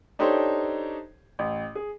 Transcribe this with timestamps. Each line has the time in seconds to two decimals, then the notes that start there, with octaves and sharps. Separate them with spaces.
0.19 D4 D#4 G4 A4 C5 C#5
1.39 A1
1.75 G#4